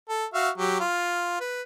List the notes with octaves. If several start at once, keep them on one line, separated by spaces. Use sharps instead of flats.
A4
F#4 E5 F5
F#3 G4
F4
B4